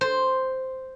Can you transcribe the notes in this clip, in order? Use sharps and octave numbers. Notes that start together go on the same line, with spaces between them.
C5